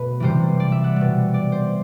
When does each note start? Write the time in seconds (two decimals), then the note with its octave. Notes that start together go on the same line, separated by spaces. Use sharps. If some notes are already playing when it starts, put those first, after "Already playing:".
Already playing: B2 A3 B4
0.20 C3 E3 G3 C5
0.60 D5
0.72 E5
0.84 F#5
0.96 B2 G3
1.34 D5
1.52 C5